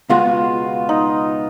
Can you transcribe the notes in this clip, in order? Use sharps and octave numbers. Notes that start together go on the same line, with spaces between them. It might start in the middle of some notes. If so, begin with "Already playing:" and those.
C#2 B2 G#3 B3 F4 F#4
D#4